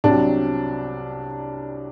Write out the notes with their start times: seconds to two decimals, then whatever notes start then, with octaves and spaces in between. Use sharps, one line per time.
0.04 C2 C3 F#3 D4